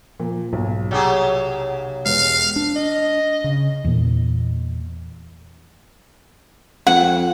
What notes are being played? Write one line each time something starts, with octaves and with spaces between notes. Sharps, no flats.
A#2 F3
B1 G#2
C3 F#3 G4 G#4
E1 G#3 B3 F5
D4
D#5
C#3
E2 A#2
F2 F#5